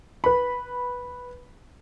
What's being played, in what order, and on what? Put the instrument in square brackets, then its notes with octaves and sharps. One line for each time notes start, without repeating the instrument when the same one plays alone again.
[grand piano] B4 B5